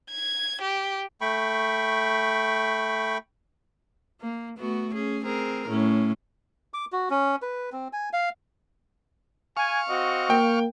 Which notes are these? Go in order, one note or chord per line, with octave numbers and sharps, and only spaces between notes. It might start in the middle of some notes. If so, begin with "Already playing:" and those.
G#6
G4
A3 G5 B5 C#6
A#3
A3 B3 F#4
C#4 G#4
C4 G#4 A#4
A2 C#4
D6
F#4
C#4
B4
C4
G#5
F5
F5 G#5 C#6
C4 F#4 D#5
A#3 G5